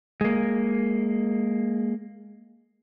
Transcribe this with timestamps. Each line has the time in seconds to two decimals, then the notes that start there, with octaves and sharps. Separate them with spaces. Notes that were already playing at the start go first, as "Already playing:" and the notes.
0.21 G#3 A#3